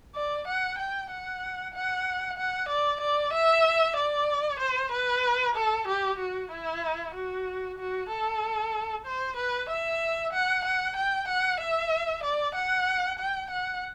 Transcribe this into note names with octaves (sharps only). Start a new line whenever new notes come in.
D5
F#5
G5
F#5
F#5
F#5
D5
D5
E5
D5
C5
B4
A4
G4
F#4
E4
F#4
F#4
A4
C5
B4
E5
F#5
F#5
G5
F#5
E5
D5
F#5
G5
F#5